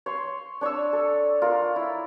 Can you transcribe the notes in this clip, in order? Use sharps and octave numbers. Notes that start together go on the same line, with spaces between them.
C#5 C6
D4 C#5 C#6 E6
A4
F4 A#4
E4